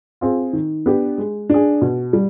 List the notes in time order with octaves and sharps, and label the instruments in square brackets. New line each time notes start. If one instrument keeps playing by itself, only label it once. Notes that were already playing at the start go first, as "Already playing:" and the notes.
[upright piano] C4 F4 G#4
D#3
B3 D4 G4
G#3
D4 G#4
B2
G3